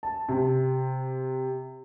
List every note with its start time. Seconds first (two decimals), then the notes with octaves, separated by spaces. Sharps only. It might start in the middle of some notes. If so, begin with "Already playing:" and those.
0.03 A5
0.29 C3